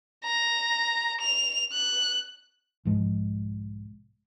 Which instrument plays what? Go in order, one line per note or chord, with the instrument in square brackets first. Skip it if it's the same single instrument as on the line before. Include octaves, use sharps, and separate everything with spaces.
[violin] A#5
F7
F#6
[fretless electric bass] B1 G#2 F3 G#3